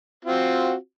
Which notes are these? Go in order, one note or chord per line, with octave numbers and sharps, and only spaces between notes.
C4 F4 F#4